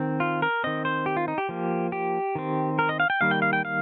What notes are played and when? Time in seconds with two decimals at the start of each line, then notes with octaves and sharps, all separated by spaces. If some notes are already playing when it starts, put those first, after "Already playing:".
Already playing: D#3 C4
0.20 F4
0.42 A#4
0.64 D#3 C4 D#5
0.85 C5
1.06 G4
1.17 F4
1.28 D#4
1.38 G4
1.49 F3 A#3
1.92 G4
2.35 D#3 C4
2.79 A#4
2.89 D#5
3.00 F5
3.10 G5
3.21 D#3 G3 A#3 F5
3.31 G5
3.42 F5
3.53 G5
3.65 F5